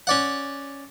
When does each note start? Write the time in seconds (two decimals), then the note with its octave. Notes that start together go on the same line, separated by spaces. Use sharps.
0.07 C#4 D5 F#5